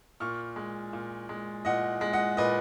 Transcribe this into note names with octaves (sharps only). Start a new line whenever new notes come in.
A#2 C#6 F6
G#3
A#2
G#3
A#2 D#5 F#5
G#3
D#5 F#5
A#2 B4 D#5